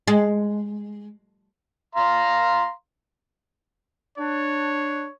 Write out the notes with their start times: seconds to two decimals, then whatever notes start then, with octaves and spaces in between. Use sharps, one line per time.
0.08 G#3
1.95 F5 A#5 C6
4.18 D4 C#5